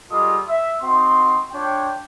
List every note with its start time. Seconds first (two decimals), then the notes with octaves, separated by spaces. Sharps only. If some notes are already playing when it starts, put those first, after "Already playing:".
0.11 G3 G#3 F4 A4 D#5 D#6
0.47 E5
0.82 C4 D#4 F#4 C6
1.52 D4 F4 C#5 G5